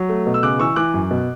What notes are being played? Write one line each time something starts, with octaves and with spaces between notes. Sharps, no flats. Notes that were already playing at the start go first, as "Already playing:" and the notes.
Already playing: F#3
A3
B2
E6
C#3 D6 F#6
E3 C#6 E6
E3 D6 F#6
F#2
B2